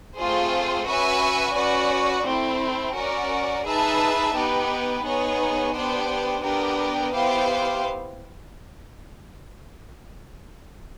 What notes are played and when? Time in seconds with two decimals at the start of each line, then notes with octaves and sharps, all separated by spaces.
0.16 A3 C4 F4 G#4 C5
0.86 C#4 F#4 B4 E5 G#5
1.55 C#4 F#4 B4 D5
2.25 A3 C4 E4
2.96 C#4 F#4 A#4 D5
3.65 D#4 G#4 B4 E5 A5
4.34 B3 D#4 G4 B4
5.05 B3 D#4 G#4 C#5
5.74 B3 D4 G4 C5
6.43 B3 D4 G4 A#4
7.13 B3 E4 G4 C5 F5